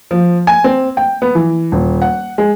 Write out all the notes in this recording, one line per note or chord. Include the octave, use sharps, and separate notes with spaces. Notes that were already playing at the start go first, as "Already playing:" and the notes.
F3
G#5
C4
G5
B3
E3
D#1
F#5
G#3